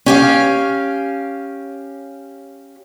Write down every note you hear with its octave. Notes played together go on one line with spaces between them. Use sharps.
C#4 G4 F5